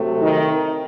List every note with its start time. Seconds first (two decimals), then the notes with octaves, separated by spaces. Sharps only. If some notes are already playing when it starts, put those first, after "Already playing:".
Already playing: C3 F#3 A3
0.21 D#3 D#4